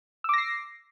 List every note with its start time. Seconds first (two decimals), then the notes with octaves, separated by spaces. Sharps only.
0.24 E6
0.29 D6
0.34 A#6
0.38 C7